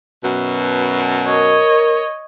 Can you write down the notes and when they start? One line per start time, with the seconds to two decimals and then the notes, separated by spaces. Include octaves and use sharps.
0.23 F#2 B2
1.26 A#4 C#5 D#5